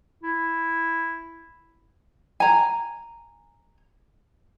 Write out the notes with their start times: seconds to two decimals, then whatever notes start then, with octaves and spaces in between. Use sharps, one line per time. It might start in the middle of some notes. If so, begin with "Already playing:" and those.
0.23 E4
2.40 G#5 A#5